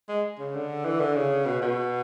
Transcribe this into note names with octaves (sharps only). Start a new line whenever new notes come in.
G#3
C#3
D3
E3
D3
C#3
B2
B2